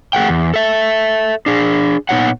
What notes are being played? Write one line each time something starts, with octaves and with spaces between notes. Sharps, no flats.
A3 G#4 F#5 G5
E2
A4 E5
D4 G#4
A#2 B3 D#4 F4 C#5 F#5